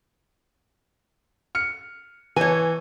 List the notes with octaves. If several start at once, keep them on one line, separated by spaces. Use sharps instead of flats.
F6 C#7
E3 C#5 G#5